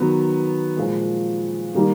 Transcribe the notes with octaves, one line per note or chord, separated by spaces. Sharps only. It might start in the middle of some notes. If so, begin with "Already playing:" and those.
Already playing: D#3 F#3 B3
A#2 F3 G#3
D#3 G3 A#3 D#4